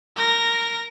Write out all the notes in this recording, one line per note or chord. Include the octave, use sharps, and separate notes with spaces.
A#4 A#6